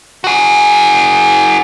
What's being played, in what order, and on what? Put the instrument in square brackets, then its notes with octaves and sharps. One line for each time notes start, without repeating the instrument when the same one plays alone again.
[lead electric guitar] F#4 G#4